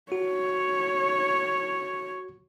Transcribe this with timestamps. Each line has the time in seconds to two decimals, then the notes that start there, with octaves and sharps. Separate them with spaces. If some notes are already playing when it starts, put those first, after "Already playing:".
0.12 F#4 C#5